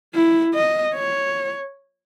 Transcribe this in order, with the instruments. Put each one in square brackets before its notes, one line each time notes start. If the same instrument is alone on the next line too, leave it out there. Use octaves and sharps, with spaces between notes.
[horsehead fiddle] E4
D#5
C#5